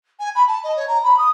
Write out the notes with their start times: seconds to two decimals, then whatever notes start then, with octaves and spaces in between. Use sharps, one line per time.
0.20 G#5
0.35 B5
0.48 A5
0.64 D#5
0.77 C#5
0.88 A#5
1.03 B5
1.18 D#6